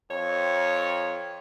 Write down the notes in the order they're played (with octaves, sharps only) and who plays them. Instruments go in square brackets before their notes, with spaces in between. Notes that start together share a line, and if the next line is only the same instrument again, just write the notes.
[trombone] F2 [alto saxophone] C#5